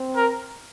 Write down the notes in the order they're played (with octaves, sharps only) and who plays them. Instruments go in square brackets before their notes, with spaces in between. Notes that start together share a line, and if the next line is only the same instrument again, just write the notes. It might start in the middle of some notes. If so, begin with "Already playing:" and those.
Already playing: [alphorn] C4
[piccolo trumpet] A#4